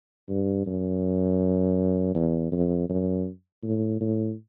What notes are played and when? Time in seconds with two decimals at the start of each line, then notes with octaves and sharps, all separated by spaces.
0.29 G2
0.66 F#2
2.15 E2
2.52 F2
2.89 F#2
3.63 A2
4.01 A2